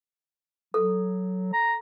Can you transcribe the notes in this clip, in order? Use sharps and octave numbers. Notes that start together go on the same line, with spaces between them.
F#3 A4
A#5